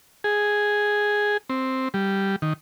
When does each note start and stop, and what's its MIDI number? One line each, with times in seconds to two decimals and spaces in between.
0.24 1.37 68
1.49 1.88 60
1.94 2.36 55
2.42 2.53 51